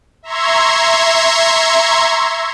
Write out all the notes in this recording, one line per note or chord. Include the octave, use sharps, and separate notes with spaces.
E5 A#5 C6 C#6 G#6